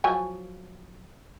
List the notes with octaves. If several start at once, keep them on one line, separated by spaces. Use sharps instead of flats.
F3 F#3 G#5